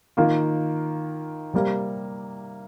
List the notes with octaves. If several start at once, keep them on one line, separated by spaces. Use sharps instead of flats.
D#3 A#3 F4
C3 G3 A#3